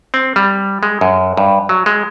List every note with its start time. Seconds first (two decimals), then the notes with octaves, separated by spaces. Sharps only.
0.14 C4
0.36 G3
0.83 G#3
1.01 F#2
1.37 G2
1.69 F#3
1.86 G#3